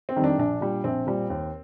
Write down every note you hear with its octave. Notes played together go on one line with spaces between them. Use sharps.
C4
F2 D#3 G3
D4
A#1 D4
A#2 G3
A#1 C4
A#2 G3
D#2